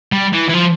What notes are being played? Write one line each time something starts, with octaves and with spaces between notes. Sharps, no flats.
G3
E3
E3
F3